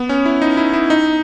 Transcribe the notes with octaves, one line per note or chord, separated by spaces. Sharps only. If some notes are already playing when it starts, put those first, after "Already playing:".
Already playing: B3
C#4
E4
D#4
E4
E4
D#4